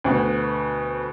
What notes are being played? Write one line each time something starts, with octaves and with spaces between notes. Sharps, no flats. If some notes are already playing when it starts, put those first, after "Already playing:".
D2 B2 B3